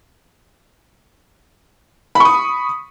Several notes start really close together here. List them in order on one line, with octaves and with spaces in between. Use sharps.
B5 C#6 D#6